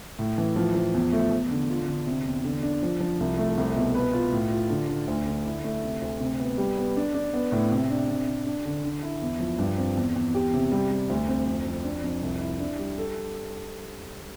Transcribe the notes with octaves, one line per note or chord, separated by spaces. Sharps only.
A2
E3
F3
F3
E2
A3
E2
D3
F4
D3
C3
E2
D3
D4
F3
F3
C2
A3
C2
B2
B4
F4
A2
F4
D3
D3
D2
D3
E4
A3
C3
D2
C3
B3
G3
B3
D4
D4
B3
A2
C3
D4
C3
C3
D4
D3
D3
E4
E2
F3
G2
C4
E2
E2
G4
C3
G3
G3
D2
C4
F2
F2
D4
F2
C2
E4
D4
G3
A4